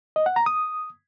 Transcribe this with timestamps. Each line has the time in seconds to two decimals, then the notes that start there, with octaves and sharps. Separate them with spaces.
0.16 D#5
0.26 F#5
0.36 A#5
0.46 D#6